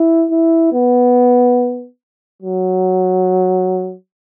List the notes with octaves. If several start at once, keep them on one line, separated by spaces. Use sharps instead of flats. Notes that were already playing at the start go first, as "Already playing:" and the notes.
Already playing: E4
E4
B3
F#3